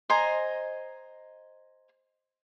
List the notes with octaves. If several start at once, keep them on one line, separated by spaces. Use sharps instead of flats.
C5 D#5 G#5 A#5